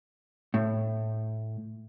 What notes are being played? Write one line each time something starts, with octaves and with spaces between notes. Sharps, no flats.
A2